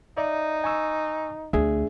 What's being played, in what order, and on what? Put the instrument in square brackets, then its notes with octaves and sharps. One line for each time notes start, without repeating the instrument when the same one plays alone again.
[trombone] D#4 [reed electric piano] D5 E5
[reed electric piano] G#5 C#6 E6
[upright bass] D2 [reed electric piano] D4 G#4 E5